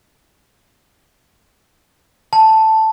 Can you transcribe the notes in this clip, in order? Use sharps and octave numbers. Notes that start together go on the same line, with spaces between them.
A5